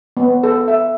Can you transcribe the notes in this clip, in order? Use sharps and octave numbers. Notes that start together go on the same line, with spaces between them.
B3
A4
E5